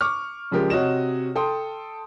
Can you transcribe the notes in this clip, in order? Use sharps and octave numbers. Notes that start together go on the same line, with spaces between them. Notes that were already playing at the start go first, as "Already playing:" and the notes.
C#6 D6 F6
C#3 F3 G#3 G4 A#4
C3 F#4 C#5 D#5 E7
A4 G5 C6 D#6